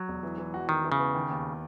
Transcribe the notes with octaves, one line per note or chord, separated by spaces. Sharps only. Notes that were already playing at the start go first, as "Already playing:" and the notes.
Already playing: F#3
E1
E3
E3
F#4
D#3 F#4
E3
C#3
B3
D#3
D#2